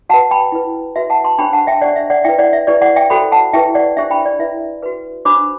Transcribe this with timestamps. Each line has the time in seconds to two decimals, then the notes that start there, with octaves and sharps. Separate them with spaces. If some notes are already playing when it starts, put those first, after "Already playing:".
0.09 F#4 B4 F#5 A5
0.31 G5 B5
0.52 E4 B4
0.96 F#4 B4 E5
1.10 F#5 A5
1.24 A5 C6
1.39 D4 G4 C5 G5 B5
1.53 F#5 A5
1.67 E5 G5
1.81 D4 G4 C5 D5 F#5
1.96 E5
2.10 D5 F#5
2.24 E4 B4 E5 G5
2.39 D5 F#5
2.53 E5
2.67 E4 G4 B4 D5
2.82 D5 F#5
2.96 E5 G5
3.10 F#4 A4 C5 G5 B5
3.32 F#5 A5
3.53 E4 G4 B4 E5 G5
3.75 D5 F#5
3.97 D4 G4 C5 E5
4.10 G5 B5
4.26 D5
4.39 E4 B4 E5
4.83 F#4 B4
5.25 D4 F#4 C5 B5 D6